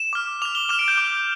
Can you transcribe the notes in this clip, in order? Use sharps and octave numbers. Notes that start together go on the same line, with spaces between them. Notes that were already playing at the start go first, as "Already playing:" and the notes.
Already playing: E7
D6 F6
D6 F6 F7
G7
D6 F6 E7
D7
G6
D6 F6